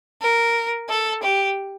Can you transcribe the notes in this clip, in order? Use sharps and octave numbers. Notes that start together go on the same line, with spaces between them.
A#4
A4
G4